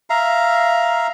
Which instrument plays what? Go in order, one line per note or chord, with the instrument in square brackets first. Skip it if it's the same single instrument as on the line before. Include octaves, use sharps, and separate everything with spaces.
[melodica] E5 F5 A#5